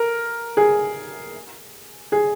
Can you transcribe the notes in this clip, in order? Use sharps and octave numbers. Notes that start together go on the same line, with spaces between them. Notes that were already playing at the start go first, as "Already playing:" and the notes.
Already playing: A#4
G#4
G#4